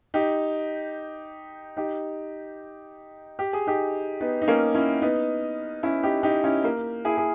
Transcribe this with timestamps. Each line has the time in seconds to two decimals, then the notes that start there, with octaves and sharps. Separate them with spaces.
0.14 D#4 G4
1.77 D#4 G4
3.39 G4
3.53 G#4
3.67 D#4 G4
4.20 B3 D#4
4.42 D#4
4.48 A#3 C#4
4.75 C#4 E4
5.02 B3 D#4
5.83 C#4 E4
6.03 D#4 G4
6.23 D#4 G4
6.44 C#4 E4
6.64 A#3
7.05 E4 G#4
7.17 G#4